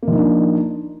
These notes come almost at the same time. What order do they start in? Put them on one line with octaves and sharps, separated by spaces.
A#3 F3 D#4 D4